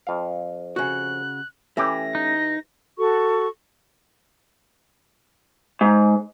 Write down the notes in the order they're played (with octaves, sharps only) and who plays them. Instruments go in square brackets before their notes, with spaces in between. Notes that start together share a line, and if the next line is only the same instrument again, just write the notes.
[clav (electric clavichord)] F2 F5
[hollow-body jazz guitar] C#3 F#4 [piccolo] F#6
[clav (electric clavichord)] E3 G4 [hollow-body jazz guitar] A3 C#4 [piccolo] A#6
[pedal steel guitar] D#4
[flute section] F#4 A4 C#6
[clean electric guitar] G#2